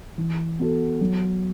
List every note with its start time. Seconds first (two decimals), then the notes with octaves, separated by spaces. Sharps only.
0.18 E3
0.59 B3 F#4 A4
1.01 F#3